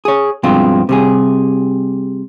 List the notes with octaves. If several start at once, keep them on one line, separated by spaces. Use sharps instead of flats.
G#4 C#5
G2 B2 F3 G#3 C4 F4
C3 G3 G#4